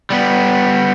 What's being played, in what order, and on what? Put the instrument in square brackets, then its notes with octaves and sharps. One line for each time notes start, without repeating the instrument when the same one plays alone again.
[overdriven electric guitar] G3 B3